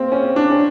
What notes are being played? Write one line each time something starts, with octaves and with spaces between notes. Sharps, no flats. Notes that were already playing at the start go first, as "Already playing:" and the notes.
Already playing: A#3 C4
C#4
D4
C#4